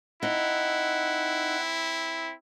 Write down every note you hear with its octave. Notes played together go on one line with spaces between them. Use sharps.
C4 D#4 E4 F#5